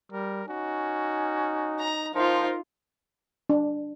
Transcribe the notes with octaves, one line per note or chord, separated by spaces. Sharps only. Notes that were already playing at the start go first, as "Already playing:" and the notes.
G3 A#4
C#4 D#4 F#4
A#5
F3 D#4 F4 A#4 C5
D4